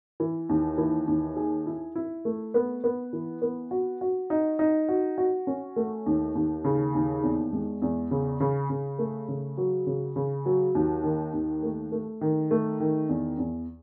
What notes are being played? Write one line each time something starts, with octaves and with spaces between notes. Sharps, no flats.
E3
D#2
E3
D#2
G#4
E4
E4
A3
B3
B3
E3
B3
F#4
F#4
D#4
D#4
F#4
F#4
C#4
A3
D#2
D#2
C#3
D#2
E2
G#3
E2
C#3
C#3
C#3
A3
C#3
F#3
C#3
C#3
F#3
D#2
D#3
D#2
A3
A3
D#3
A3
D#3
E2
E2